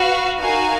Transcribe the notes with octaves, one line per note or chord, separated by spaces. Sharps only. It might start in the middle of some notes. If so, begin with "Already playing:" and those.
Already playing: F#4 B4 F5
D#4 F#4 A#4 F5 G#5